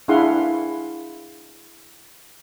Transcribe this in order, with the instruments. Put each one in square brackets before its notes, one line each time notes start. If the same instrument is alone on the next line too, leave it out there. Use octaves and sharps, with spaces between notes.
[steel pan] D4 E4 G#4 F5 F#5 C6